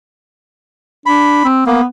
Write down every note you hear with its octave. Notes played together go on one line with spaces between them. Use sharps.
D4 B5
C4
A#3 B3